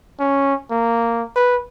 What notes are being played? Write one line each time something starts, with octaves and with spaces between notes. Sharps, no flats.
C#4
A#3
B4